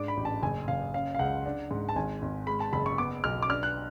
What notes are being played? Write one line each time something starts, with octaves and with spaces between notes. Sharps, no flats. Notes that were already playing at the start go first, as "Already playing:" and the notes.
Already playing: G#2 D4 D6
B5
A1
A5
F#1 G#5
F#1 F5
C#4 F5
F5
C#2 F#5
D4
G#2
A5
G#1 G#5
G#1
G#3 B5
A5
F#1 B5
C#6
B3 D6
B1 F6
D6
D4 F6
F#6